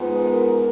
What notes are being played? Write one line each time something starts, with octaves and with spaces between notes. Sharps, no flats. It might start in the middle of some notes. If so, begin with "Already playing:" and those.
Already playing: G#2 F3 B3
A#4